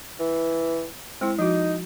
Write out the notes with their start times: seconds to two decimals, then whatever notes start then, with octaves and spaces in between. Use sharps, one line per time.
0.20 E3
1.21 G#3 C4 E4
1.39 F3 D#4 F#4